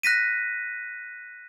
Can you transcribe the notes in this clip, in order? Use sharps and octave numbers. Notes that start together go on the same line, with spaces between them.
F#6 A#6 B6 D#7